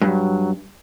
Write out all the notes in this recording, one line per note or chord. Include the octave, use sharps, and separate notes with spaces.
G2 F#3